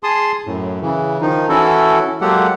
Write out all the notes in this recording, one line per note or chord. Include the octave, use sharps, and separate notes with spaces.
G#4 A5 C6 D#6
F#2 A2
C#3 E3
D#3 F3 D#4
E3 C#4 E4 F#4 A4
F#3 G#3 A#3 G4 A4 F#5